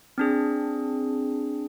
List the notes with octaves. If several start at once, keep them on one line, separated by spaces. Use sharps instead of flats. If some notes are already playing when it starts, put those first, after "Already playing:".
C4 D4 G#4